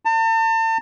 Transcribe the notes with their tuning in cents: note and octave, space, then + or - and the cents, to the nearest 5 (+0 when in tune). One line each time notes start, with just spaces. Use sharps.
A5 +40